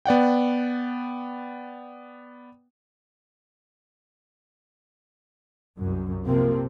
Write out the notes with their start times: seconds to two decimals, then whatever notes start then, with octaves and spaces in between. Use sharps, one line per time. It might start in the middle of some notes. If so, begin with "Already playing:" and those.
0.06 B3 D5 F#5 G5
5.79 C2 F#2
6.26 C3 F3 A#3 C4 A#4